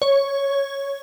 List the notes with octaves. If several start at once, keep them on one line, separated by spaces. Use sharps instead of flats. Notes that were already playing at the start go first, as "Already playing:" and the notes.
C#5